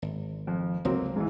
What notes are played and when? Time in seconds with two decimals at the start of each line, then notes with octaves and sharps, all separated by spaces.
0.02 G#1
0.47 F2
0.85 F1 C#2 F3 F#3 A#3 C4
1.16 G#2 E3